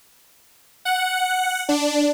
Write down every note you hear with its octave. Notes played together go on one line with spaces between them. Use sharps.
F#5
D4